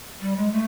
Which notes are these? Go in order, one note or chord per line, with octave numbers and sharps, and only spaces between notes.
G3
G#3
A3